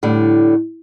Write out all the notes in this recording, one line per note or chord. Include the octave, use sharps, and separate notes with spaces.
A2 D3 G3